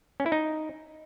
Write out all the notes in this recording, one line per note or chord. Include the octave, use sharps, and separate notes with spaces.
C#4
E4
D#4